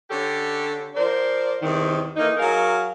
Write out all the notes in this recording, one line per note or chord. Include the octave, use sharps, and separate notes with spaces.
D3 C#4 G4 A4
F3 A#4 C5 D5
E2 G2 C3 D#3
E3 A3 A#3 D#4
F#3 F#4 G#4 A#4 F5